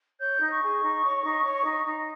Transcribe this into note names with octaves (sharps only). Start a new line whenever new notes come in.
C#5 G6
D#4
C#6
G#4
D#4
C#5
D#4
C#5
D#4
D#4